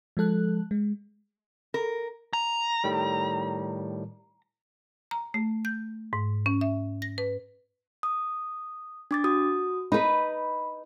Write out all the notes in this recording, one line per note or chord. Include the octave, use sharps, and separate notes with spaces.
F3 G#3 A4 F#6
G#3
A#4
A#5
A2 D#3 G3
A#5
A3
G6
G#2
C#4
E5
A#6
B4
D#6
D4 D6 A6
F#4 D#6
D#4 B4 B5